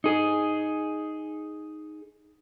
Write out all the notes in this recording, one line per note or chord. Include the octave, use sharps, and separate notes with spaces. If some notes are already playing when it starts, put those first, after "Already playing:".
D#4 G#4